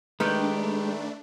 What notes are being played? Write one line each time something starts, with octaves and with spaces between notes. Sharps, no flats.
D#3 G#3 A3 D4 G4 B4